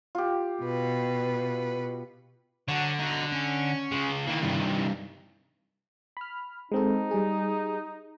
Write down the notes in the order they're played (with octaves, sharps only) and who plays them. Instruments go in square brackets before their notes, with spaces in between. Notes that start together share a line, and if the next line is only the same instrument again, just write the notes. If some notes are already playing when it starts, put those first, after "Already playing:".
[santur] F4 G4
[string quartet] B2 B4
[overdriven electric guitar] D3 [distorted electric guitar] C#5 F#5
[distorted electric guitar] D#4 F#4
C#4
[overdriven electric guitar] C#3 G#3
[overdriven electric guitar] D#3 E3 [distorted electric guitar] A#3
[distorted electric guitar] G2 C3
[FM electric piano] B5 F6
[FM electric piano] G#3 C4 A4 [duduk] D#4
[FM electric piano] G3 G#4